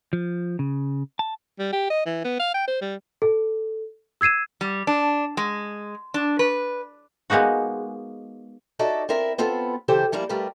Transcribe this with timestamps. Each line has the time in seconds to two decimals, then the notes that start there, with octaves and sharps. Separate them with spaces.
0.13 F3
0.59 C#3
1.19 A5
1.59 G3
1.73 G4
1.90 D#5
2.06 E3
2.25 B3
2.40 F5
2.55 G5
2.67 C5
2.81 G3
3.22 A4
4.21 E6 G#6 C7 D#7 E7
4.61 G3
4.87 D4
5.37 G#3
6.14 D4
6.39 B4
7.30 G#3 A#3 B3 D#4 F#4
8.79 D#4 F#4 A4 D5 E5
9.09 C4 E4 F4 A#4 E5
9.38 B3 C4 F4 A4
9.88 C#3 E3 G4 A4 C5 G5
10.12 F3 G3 A#3 E4
10.29 G3 A3 F4 G4 A#4 B4